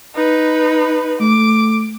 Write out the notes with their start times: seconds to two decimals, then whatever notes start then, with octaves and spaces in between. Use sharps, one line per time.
0.15 D#4 B4
1.21 A3 D6